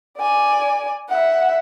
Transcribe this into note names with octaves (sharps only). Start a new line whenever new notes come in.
D5 G#5
E5 F#5